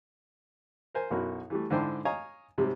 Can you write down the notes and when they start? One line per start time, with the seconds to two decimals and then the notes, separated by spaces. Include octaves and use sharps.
0.95 A#4 C5 G#5
1.11 B1 F#2 B2 E4 F#4 A#4
1.50 E3 G3 A3
1.70 G#2 D3 E4 C5 G5 C6
2.05 C#5 D#5 F5 G#5 A#5
2.58 G#2 C3 F#3 G3